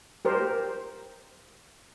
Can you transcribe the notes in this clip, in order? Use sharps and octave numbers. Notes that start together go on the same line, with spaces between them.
G4 A#4 C5